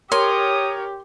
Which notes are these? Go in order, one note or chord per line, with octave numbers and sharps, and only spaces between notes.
G4 A#4 C#5 C6 D#6